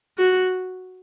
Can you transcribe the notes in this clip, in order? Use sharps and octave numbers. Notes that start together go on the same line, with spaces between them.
F#4